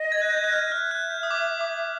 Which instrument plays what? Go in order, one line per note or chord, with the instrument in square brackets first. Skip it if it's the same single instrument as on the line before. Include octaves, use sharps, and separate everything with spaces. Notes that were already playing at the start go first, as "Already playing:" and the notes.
Already playing: [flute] D#5
[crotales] G#6
F#6
G6
F#6
F6
[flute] E5 [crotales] F6
[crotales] F#6
G6
D#6
D6
D6
D6